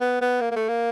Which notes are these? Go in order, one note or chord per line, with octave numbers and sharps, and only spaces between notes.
B3
B3
A#3
A#3
A3
A#3